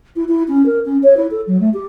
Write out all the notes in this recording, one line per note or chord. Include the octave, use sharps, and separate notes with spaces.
E4
E4
C#4
A#4
C#4
C#5
E4
A4
F#3
A3
G4